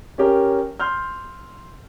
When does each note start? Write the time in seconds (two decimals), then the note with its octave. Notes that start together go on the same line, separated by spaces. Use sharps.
0.18 C#4 G4 A#4
0.80 C6 F6 G6